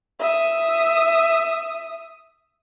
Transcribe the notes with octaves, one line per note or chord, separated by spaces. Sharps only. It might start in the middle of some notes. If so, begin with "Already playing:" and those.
E5 D#6